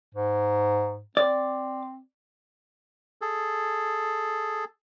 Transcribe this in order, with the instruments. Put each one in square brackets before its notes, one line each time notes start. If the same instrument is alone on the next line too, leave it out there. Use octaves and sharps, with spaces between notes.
[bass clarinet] G#2
[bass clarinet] C4 [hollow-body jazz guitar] D5
[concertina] G#4 A4